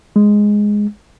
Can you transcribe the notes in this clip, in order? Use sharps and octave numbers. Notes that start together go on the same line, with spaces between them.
G#3